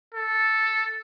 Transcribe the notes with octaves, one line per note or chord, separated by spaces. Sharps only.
A4